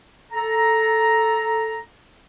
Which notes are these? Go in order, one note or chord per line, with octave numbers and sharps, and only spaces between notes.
A4 A#5